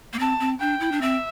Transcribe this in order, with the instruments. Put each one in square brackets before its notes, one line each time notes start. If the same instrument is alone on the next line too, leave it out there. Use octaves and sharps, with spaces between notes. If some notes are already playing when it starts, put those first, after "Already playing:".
[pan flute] A#3
[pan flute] C4 [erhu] A5
[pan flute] C4
[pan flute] D4 [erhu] G5
[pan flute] E4
D4
[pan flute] C4 [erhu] E5